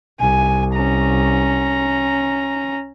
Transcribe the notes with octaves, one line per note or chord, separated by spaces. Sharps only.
C2 G#5
C#4 A#5